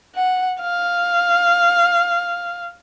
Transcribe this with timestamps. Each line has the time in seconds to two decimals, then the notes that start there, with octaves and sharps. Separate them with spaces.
0.15 F#5
0.61 F5